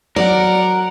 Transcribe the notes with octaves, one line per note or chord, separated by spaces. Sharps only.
F#3 A#4 D5 F#5